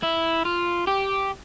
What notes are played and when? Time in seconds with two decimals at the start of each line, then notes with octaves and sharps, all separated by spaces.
0.03 E4
0.45 F4
0.87 G4